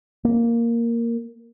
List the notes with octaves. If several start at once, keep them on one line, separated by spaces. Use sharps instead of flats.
A#3